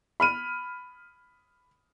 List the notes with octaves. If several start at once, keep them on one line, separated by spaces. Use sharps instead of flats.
B5 F6 D#7